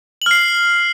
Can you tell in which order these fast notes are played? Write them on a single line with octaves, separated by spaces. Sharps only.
F#7 F6 C7